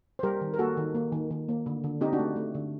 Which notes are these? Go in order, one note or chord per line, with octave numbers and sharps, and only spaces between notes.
C5
G3 G4 A#4
D#3
A#4
A#3 F#4 A4
D#3
A#3
D#3
D#3
A#3
D3
D3
C4 D#4 G4
D4 F#4
A3
A3
D3